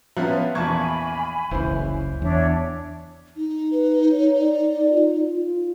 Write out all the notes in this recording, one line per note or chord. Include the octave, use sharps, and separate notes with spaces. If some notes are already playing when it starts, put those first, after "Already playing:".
F3 B3 C#4 E5 F5 F#6
A#1 E2 G#5 A5 B5 C#6 G#6
F#1 C#2 E3 C5
E2 D4 C#5 E5
D#4
B4
C#5
D5
F4
F4